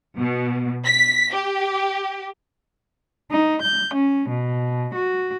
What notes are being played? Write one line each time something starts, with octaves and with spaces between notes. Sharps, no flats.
B2
B6
G4
D#4
G6
C#4
B2
F#4